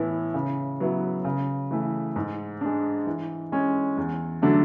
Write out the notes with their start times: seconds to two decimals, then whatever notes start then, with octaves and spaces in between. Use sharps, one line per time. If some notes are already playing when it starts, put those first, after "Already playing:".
Already playing: A2 E3 B3 E4
0.34 C#3
0.80 F#3 B3 E4
1.24 C#3
1.71 E3 A3
2.16 G#2
2.61 G#3 D4
3.06 E3
3.52 G#3 C#4
3.97 E2
4.42 D3 F#3 A3 D4